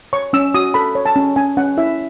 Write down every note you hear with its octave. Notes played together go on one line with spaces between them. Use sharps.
C#5 C#6
C#4 E6
F#4 D#6
A4 B5
C#5
A5
C#4
C#4 G#5
C#4 F#5
E4 E5